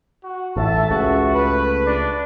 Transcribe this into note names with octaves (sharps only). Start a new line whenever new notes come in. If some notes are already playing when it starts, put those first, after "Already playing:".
F#4
A1 A4 E5 A5
C#2 C#3 F#4
A3 B4
D4